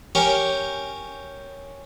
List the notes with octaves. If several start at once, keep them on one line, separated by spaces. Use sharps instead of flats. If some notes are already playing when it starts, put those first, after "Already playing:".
C#4 G4 A#4 G5